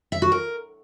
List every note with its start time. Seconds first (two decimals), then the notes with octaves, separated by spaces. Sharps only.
0.12 E5
0.22 F#4
0.32 A#4